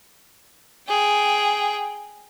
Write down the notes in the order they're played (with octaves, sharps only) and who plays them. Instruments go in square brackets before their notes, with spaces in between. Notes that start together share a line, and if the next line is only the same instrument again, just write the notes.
[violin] G#4 G5